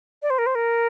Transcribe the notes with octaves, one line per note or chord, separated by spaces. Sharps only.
D5
C5
A#4
C5
A#4